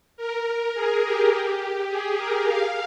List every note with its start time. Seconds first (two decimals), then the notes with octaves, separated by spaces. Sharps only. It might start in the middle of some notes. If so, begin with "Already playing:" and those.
0.17 A#4
0.74 G#4
1.03 G4
1.89 G#4
2.17 A#4
2.46 F5